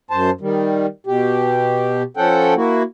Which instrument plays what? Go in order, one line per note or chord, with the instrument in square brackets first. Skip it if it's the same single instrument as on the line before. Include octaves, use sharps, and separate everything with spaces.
[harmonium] F#2 C5 A5
D#3 G3
B2 G4
F3 C#4 A4 F#5 G5
A#3 E4 F#4